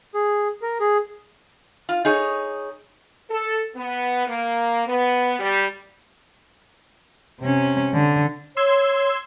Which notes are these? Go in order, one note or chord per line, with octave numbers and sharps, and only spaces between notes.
G#4
A#4
G#4
F4
D#4 G#4 C#5
A4
B3
A#3
B3
G3
C3 C#4
D3
C#5 C6 E6 G#6